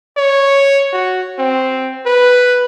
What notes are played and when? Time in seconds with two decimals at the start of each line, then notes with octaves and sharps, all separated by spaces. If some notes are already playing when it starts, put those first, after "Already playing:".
0.17 C#5
0.93 F#4
1.39 C4
2.06 B4